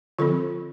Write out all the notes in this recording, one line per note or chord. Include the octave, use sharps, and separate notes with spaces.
D3 F3 C4 F4 A4